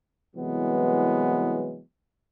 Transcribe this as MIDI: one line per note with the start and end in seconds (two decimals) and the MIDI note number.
0.36 1.82 36
0.36 1.82 52
0.36 1.82 54
0.36 1.82 56
0.36 1.82 59